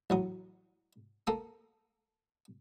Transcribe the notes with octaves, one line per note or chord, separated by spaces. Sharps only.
A1 F#3 D#6
A#3 A4 D#6